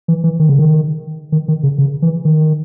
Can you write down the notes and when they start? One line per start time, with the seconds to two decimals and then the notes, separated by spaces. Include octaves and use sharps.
0.08 E3
0.24 E3
0.40 D#3
0.49 C#3
0.59 D#3
1.32 D#3
1.48 D#3
1.63 C#3
1.78 C#3
2.02 E3
2.25 D#3